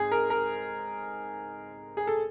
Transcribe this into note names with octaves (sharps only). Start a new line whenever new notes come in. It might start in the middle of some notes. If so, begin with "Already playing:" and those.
Already playing: G#2 G#3 C4 G#4
A#4
A#4
G#4
A4